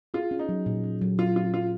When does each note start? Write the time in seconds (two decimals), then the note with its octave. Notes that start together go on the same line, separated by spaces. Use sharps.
0.14 F4 G#4
0.31 C#4
0.39 D#4
0.49 F#3
0.66 A#2
0.84 C#4
1.01 F#3
1.18 F#3 F4
1.36 C#4 F4
1.54 F#3 F4